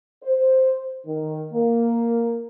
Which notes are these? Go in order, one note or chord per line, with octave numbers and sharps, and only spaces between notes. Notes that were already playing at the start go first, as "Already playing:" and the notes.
C5
D#3
A#3